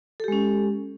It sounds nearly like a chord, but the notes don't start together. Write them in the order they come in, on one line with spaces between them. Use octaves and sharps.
A4 G4 G#3 C#4